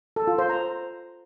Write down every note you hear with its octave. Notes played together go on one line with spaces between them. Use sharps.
A4
F4
C5
A#5